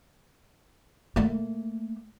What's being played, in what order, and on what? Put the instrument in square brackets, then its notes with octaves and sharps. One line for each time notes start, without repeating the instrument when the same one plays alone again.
[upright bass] A3 A#3